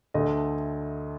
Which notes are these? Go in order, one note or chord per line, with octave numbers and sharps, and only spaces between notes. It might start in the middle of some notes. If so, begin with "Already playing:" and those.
D2 D3 A3 D#5